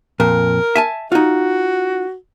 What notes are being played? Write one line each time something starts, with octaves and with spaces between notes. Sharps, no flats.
F2 A#2 A#4
E5 G#5 A5
D#4 F4 F#4